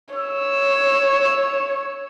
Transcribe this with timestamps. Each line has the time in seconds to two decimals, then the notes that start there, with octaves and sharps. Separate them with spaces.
0.15 C#5 E6